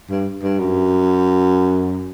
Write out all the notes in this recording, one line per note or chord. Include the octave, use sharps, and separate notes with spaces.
G2
G2
F#2